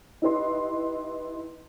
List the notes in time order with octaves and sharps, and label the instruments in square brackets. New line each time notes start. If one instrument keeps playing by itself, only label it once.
[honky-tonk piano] D#4 E4 G4 B4 D#5 C6